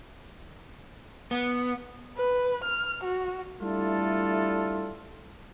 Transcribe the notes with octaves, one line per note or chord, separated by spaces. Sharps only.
B3
B4
F6
F#4
G3 A3 D4 E4 F4 A4